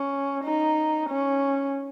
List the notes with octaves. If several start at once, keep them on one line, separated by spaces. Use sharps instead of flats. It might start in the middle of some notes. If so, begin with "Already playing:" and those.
Already playing: C#4
D#4
C#4